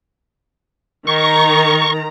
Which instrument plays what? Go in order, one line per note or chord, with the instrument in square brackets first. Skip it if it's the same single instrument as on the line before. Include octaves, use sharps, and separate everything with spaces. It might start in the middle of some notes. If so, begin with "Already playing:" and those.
[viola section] D#3 A#5 [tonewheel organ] C#6